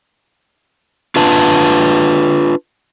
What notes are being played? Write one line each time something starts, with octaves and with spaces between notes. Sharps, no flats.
D4 F4 B4 A5